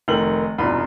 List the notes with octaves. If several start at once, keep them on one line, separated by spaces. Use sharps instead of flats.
F1 D#3 F#7
E1 C2 F#2 D#4 F4 B5